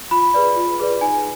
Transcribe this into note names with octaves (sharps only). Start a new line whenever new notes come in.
F4 B5
G#4 B4 D5
F4
G#4 B4 D5
D#4 G#5